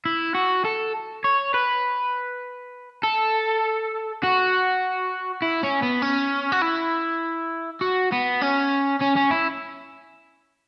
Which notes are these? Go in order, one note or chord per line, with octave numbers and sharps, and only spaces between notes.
E4
F#4
A4
C#5
B4
A4
F#4
E4
C#4
B3
C#4
F#4
E4
F#4
B3
C#4
C#4
C#4
E4